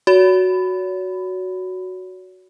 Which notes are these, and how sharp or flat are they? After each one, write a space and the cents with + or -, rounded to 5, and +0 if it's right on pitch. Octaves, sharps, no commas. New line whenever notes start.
F#4 +0 C#5 +40 B5 +15